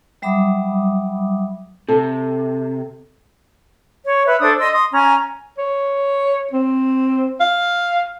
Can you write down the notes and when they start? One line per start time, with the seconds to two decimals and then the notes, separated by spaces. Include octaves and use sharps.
0.22 F#3 G3 E5 B5 D6 D#6
1.89 C3 A4
4.03 C#5
4.24 B4 E5
4.40 D4 A4 C5 D#6
4.58 D#5 C6 E6
4.71 C6 D#6
4.92 C#4 G#5 A#5
5.58 C#5
6.53 C4
7.40 F5